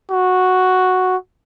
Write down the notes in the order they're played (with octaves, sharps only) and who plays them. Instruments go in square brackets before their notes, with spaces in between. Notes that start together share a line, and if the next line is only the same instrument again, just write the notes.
[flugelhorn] F#4